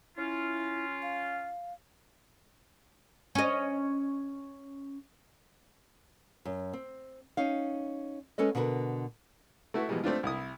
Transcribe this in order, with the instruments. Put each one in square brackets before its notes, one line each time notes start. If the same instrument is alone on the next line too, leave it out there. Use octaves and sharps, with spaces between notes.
[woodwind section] C#4 F4 [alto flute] E4
[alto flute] F5
[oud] C#4 D#5
[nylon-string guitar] F#2
C4
C#4 D#4 F5
G#3 C#4 A4 B4 D#5
B2 D3 F#4 A#4 B4
[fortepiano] A3 E4 F#4 B4
B2 E3 F3 G3 G#3
A3 C4 D4 F4
C2 E4 D#6